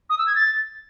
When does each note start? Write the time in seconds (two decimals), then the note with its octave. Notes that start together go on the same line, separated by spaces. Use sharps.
0.10 D#6
0.18 E6
0.27 G#6
0.35 A6